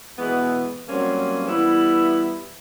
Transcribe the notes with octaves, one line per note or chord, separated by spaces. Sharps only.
B2 E3 G#3 B3
F#3 G3 A#3 C4 C#4
E3 G3 B3 E4